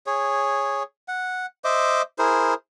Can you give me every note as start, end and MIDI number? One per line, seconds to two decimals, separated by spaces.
0.06 0.83 68
0.06 0.83 73
1.08 1.46 78
1.64 2.02 72
1.64 2.02 75
1.64 2.02 76
1.64 2.02 86
2.19 2.54 64
2.19 2.54 68
2.19 2.54 70
2.19 2.54 72